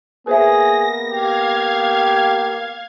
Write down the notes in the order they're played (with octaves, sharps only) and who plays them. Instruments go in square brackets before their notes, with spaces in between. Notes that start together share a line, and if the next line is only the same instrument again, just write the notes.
[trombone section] A#3 B3 [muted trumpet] G#4 [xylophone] B4 C5 E5 [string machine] A#6
[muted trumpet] G4 [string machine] F5 G#6